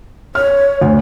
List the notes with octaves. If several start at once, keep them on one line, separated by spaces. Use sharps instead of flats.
C#5 F6
D2